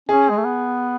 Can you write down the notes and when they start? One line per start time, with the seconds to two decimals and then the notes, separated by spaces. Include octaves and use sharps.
0.09 C#4 G#4
0.30 G#3
0.37 A3
0.45 B3